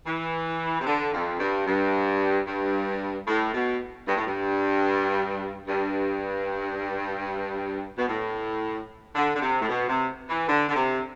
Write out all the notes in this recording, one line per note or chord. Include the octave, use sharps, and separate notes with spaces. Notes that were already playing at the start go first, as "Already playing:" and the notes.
E3
C3
D3
F2
G2
G2
G2
A2
B2
G2
A2
G2
G2
B2
A2
D3
D3
C3
A2
B2
C3
E3
D3
D3
C3